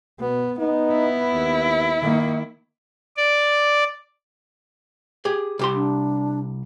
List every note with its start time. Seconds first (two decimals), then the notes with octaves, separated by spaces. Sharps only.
0.20 B2 B3
0.59 B3 D#4
0.91 E4
1.33 D#2
2.02 D#3 A#3
3.17 D5
5.25 G4 G#4
5.59 C2 G4 C6
5.75 D4